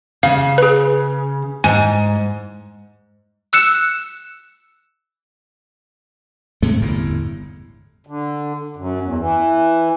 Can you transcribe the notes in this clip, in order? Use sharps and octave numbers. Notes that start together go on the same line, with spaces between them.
C#3 F5
G#4 B4
G#2 G#5
E6 F#6 C#7 E7
A2 C3 G#3 A3
G1 E2 A2
D3
F#2
E2
E3